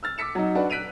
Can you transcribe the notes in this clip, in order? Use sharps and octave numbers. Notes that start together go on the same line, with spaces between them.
E6 F6 A6
D6 E6 B6 C#7 E7
F#3 D#4
D4 F#4 B4
F#6 B6 D7 D#7 F7